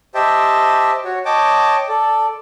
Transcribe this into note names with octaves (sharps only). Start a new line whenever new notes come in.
G4 C5 D#5 E5 G5 A5
F#4 C#5
C#5 D#5 G5 A5 D6
A4 D5